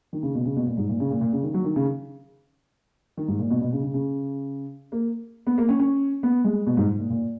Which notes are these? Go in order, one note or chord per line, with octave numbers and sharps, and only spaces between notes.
D#3
C#3
B2
C#3
B2
A#2
G#2
A#2
C#3
A#2
A#2
C#3
D#3
F#3
D#3
C#3
D#3
G#2
A#2
B2
B2
C#3
C#3
C#3
A#3
B3
A#3
C#4
C#4
B3
G#3
B2
G#2
A#2
A#2